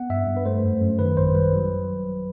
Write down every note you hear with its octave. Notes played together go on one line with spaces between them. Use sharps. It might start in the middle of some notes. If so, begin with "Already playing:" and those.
Already playing: B3 F#5
G2 E5
G2
B4
A3 C5
F#2
F#2
D#3 B4
A1 C5
G3 B4
F#3